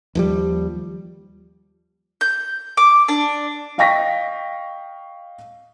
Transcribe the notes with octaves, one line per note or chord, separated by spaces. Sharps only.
D#2 F3 G3
G6
D6
D4
D#5 F5 G5 C#6 A#6 B6